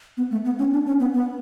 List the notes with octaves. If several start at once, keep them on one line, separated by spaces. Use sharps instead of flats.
B3
A3
B3
C#4
D4
C#4
B3
B3